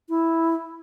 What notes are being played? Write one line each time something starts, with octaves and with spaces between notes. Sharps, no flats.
E4